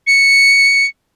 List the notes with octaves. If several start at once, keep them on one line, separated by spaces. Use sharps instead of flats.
C#7